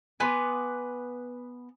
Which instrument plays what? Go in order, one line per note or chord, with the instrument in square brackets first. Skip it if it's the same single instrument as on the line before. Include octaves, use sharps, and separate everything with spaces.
[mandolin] B3 B4 [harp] G#5 C6 D6